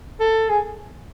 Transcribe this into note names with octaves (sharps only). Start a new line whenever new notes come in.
A4
G#4